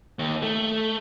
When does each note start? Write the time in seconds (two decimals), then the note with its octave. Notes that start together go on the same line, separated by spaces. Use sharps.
0.19 D#2
0.43 A3